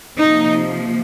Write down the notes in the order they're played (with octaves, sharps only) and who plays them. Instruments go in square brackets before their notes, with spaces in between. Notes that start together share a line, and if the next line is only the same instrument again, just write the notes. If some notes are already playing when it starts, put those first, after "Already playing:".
[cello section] C3 F3 A#3 D#4